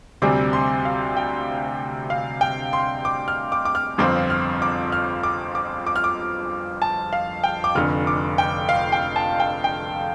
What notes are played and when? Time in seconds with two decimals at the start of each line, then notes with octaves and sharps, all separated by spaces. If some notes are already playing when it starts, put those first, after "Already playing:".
0.22 D2 C3 G3 C4 D6
0.53 C6
0.85 F5
1.17 G5
2.10 F5
2.41 G5
2.73 C6
3.05 D6
3.28 F6
3.52 D6
3.65 D6
3.75 F6
3.98 G1 F2 F3 C4 D6
4.30 F6
4.62 D6
4.92 F6
5.23 D6
5.55 D6
5.87 D6
5.96 F6
6.04 D6
6.82 A5
7.13 F5
7.44 G5
7.64 D6
7.75 F1 F2 D3 F6
8.07 D6
8.38 G5
8.69 F5
8.92 G5
9.16 A5
9.40 G5
9.64 G5